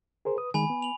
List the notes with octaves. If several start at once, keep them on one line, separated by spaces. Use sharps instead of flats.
G#4 A#4 C5
B4 D#6
D#3 G#3 G#5 B5
B3
F7 F#7